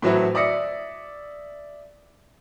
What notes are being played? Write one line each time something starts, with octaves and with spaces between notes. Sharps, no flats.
A2 E3 F#3 C4 E4 F#4
D5 E5 D#6 A#6 C#7